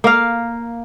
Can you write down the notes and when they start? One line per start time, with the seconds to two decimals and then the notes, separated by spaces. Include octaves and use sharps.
0.04 A#3 F5